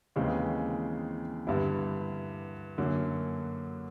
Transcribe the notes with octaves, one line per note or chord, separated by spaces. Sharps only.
D#2 C#3 E3 G#3 C4
G2 D3 G3 B3 E4
F#2 D3 F#3 A#3